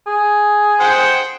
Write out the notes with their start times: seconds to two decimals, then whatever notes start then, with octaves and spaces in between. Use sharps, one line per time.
0.07 G#4
0.80 C5 F#5 G5